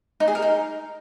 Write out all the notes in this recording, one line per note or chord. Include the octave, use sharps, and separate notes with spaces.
D#4
G#4
A#4
D#4